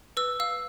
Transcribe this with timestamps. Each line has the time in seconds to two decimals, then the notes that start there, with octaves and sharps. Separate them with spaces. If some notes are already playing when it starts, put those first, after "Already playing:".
0.17 B4 E6
0.40 F5 E6